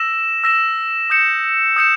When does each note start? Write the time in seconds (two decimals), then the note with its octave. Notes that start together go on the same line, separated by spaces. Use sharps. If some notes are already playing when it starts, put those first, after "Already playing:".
Already playing: E6 A#6 E7
0.44 E6 A#6 E7
1.10 D#6 G6 C#7 E7
1.76 D#6 G6 C#7 E7